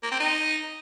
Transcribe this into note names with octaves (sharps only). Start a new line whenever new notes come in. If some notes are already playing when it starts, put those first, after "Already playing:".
A#3
C4
D#4